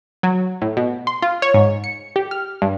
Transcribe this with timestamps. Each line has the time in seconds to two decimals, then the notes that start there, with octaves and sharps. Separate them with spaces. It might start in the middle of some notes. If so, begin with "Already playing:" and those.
0.23 F#3
0.62 A2
0.77 B2
1.07 C6
1.22 F4
1.42 C#5
1.54 G#2
1.84 C#7
2.16 G4
2.31 F6
2.62 G2